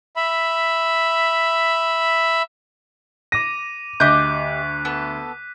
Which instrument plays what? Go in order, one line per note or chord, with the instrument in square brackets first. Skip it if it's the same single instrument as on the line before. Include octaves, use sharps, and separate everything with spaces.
[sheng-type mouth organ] E5 B5
[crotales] D6 D#7 [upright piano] A#6
[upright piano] D2 [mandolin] G4 D#5 G6 [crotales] F#6 B6
[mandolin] B3 A4